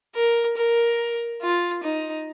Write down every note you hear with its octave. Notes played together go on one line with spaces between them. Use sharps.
A#4
A#4
F4
D#4